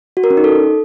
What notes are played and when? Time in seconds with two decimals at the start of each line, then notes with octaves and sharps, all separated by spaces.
0.17 F#4
0.24 A#4
0.30 C#4
0.37 D#4
0.44 A4